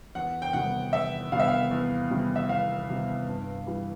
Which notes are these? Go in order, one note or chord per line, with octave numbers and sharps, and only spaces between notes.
E2 F#5
G5
C3 D#3 G3 B3 F#5
E2 E5
C3 D#3 G3 B3 F5
E5
F5
E2
C3 D#3 G3 B3
E5
E2 F5
C3 D#3 G3 B3
G2
E3 G3